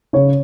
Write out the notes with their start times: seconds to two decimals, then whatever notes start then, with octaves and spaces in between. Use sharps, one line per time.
0.13 C#3 C#5